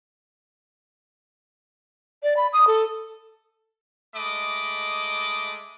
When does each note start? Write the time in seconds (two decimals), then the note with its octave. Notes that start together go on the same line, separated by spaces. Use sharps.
2.23 D5
2.37 B5
2.53 D#6
2.67 A4
4.16 G#3 A3 D#5 B5 D6